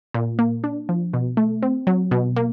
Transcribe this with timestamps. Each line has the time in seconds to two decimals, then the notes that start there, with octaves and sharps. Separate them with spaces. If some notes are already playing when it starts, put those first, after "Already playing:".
0.14 A#2
0.39 A#3
0.64 D4
0.89 F3
1.13 B2
1.37 A3
1.62 C4
1.87 F#3
2.11 B2
2.36 A#3